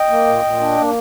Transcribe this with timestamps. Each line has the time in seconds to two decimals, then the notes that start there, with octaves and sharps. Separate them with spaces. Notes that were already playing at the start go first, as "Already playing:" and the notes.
Already playing: D#5 G5
0.09 A#3
0.27 A#2
0.44 A#2
0.60 D4
0.78 A#3